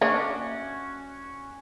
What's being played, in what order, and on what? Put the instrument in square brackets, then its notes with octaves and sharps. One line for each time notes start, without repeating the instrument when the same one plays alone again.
[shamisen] A#3 C#5 D#5 [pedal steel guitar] C#4 F#4 [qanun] D4 [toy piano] E5